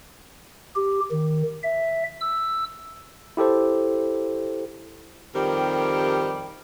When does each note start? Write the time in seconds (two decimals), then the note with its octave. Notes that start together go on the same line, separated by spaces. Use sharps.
0.76 G4
1.11 D#3
1.63 E5
2.21 E6
3.37 E4 G4 A4 C5
5.34 F2 D#3 G3 C4 G4 A#4